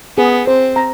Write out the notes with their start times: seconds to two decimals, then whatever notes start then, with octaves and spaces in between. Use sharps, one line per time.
0.17 B3 G#4
0.47 C4 C5
0.76 A#5